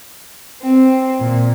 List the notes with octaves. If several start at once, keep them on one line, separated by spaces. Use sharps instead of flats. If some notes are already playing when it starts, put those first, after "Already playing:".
C4
A#2